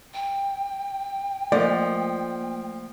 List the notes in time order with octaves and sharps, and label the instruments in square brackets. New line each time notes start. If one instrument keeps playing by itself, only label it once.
[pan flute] G5
[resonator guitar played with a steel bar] F3 [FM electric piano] A3 A#3 [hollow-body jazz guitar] D5 D#5